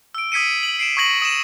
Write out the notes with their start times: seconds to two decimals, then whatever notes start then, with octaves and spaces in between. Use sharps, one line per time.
0.15 E6 D7
0.32 D#6 G#6 B6 C#7 D#7
0.63 F#7
0.79 C7 D7 E7
0.97 C#6 D#6 G#6 A#6 F#7
1.22 D#6 D#7 E7